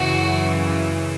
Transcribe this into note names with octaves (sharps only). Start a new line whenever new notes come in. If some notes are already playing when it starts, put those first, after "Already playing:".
Already playing: F#2 C#3 E3 F#4